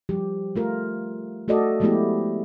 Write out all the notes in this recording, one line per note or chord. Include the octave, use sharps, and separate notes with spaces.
F3 G3 G4
A3 F4 A#4
A3 F#4 A4 D5 D#5
F3 G#3 A3 B3 E4 G4